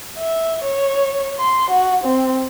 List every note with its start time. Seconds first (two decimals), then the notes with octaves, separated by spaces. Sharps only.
0.16 E5
0.64 C#5
1.39 C6
1.71 F#4
2.04 C4